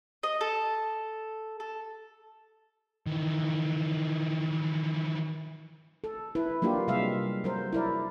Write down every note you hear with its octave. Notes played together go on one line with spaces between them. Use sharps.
D#5
A4
A4
D#3 E3
A4
E4 B4
F#3 A#3 D4 F4 G4
C3 G3 G#3 E5 F5
F#3 A#4 C5
E4 A#4 D5